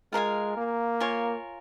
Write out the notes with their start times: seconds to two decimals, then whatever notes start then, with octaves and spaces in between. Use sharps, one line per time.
0.13 G#3 F4 A#4 F5 G#5
0.57 A#3
1.00 F4 A#4 C#5 G#5